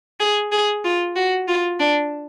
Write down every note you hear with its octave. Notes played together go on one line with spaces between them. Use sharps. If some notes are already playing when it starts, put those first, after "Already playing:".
G#4
G#4
F4
F#4
F4
D4